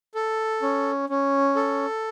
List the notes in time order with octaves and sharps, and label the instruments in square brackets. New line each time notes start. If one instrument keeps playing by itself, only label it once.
[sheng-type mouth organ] A4
C#4
C#4
A4